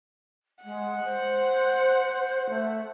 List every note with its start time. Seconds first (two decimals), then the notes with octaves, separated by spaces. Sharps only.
0.64 G#3 F#5
1.04 C5
2.49 A3